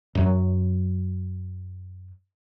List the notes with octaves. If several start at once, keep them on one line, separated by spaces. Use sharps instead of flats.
F#2 F#3